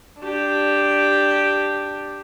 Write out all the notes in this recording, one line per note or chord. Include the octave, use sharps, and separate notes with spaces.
D4 G4